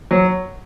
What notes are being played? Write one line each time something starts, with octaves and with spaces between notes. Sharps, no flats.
F#3